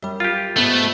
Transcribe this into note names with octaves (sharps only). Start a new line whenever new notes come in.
F#2 G3
F4 G4
G#2 A3 B3 A4